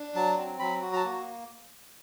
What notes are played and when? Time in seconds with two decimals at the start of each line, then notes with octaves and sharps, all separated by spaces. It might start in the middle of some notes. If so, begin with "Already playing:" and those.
Already playing: D4
0.15 F#3 A5
0.37 C4
0.59 F#3 B5
0.82 F#4
0.93 A#5
0.96 A5
1.05 A#3